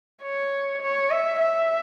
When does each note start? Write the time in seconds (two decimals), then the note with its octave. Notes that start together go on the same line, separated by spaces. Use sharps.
0.23 C#5
0.81 C#5
1.10 E5
1.39 E5